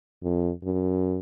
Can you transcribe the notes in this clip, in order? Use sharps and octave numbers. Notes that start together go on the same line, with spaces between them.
F2
F#2